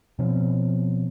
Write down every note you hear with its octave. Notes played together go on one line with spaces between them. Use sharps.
B2 F3 C4 C#4